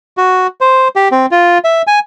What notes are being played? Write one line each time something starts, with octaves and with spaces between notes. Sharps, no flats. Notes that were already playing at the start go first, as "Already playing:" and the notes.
F#4
C5
G4
C4
F4
E5
G#5